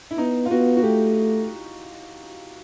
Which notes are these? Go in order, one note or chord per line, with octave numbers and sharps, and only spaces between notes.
E4
B3 D#4
F4
B3 F#4
F#4
A3 G4